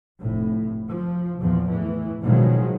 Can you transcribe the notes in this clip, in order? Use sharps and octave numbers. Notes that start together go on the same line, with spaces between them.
F1 A2
F3
E2 A#2 F3
A2 E3
B2 D#3 F3 F#3 G#3